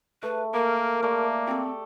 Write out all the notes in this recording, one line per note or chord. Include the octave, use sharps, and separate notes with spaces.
A3 B4
A#3 A#4
A3 A#3 D5
C4 G4 A4